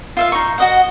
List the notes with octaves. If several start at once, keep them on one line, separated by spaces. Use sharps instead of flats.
F4 E5 F5
D#4 C#6
F#4 D#5 F#5